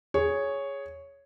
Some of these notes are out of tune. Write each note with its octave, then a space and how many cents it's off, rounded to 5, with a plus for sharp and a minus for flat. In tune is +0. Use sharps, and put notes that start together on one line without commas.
G#4 +0 C#5 +0